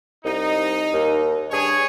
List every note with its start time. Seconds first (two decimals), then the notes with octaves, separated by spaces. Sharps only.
0.25 C2 D#4
0.93 D#2
1.51 G2 G#4 C#5